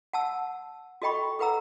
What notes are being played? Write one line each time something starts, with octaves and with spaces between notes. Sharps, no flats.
F#5 A5 E6
F#4 A4 D#5 G5 B5 C#6
A4 B4 F#5 A#5 E6